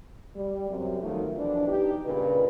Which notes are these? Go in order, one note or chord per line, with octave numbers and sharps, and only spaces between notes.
G3
F#2 C3
B2 D#3 F3 F#3 A3 F4
B2 E3 F3 D4
D#4 G4
G2 A#2 C#3 B4